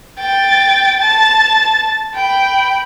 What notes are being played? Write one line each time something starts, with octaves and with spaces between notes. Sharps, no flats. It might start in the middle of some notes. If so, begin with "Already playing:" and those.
G5 A6
A5 A6
G5 B5